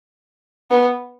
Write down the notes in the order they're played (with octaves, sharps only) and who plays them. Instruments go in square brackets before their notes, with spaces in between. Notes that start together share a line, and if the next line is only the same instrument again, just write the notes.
[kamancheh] B3